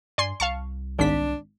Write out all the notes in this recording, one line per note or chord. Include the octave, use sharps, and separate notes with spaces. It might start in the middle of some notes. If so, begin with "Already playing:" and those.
G2 D5 G#5 C6
C2 F5 A5 C#6
G#1 D4 B6